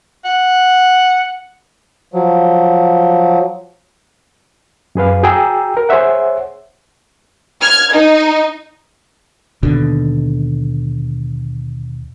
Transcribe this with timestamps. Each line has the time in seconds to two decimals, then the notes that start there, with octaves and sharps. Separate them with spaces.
0.25 F#5
2.14 F3 F#3
4.95 F#2 G#4 B4 F5
5.23 F#4 G#4 G5 A#5 E6
5.77 A#4
5.89 G#4 C5 C#5 E5 F#5
7.61 F6 G#6
7.92 D#4
9.63 D#2 B2 D3